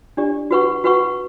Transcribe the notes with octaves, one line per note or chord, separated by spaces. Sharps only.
D4 G4 D5
F#4 B4 F#5 C#6
F#4 B4 F#5 C#6